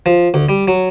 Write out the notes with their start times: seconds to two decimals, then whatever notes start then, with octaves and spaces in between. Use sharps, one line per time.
0.06 F3
0.34 D2
0.49 G3
0.68 F#3